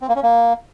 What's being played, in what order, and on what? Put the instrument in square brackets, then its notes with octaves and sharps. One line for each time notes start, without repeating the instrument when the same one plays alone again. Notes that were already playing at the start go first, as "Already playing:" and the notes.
[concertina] C4
A#3
C#4
A#3